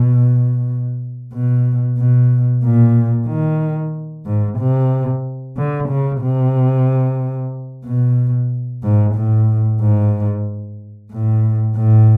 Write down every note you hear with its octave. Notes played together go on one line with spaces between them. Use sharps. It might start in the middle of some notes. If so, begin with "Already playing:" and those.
Already playing: B2
B2
B2
A#2
D#3
G#2
C3
D3
C#3
C3
B2
G#2
A2
G#2
A2
A2